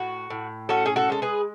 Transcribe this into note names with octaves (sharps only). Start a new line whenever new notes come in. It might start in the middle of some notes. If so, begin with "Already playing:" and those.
Already playing: A2 F#4
A2
C#4 F#4 A4
G#4
F#4 A4
G#3 A4
G#4 B4